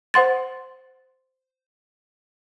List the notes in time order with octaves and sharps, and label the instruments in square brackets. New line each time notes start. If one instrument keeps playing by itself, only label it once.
[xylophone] C5 F#5 C6 A6